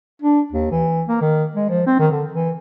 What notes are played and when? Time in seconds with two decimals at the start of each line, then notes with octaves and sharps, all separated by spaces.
0.22 D4
0.52 D#2
0.71 E3
1.08 A#3
1.21 D#3
1.55 G#3
1.69 F3
1.87 C4
1.99 D#3
2.11 D3
2.32 E3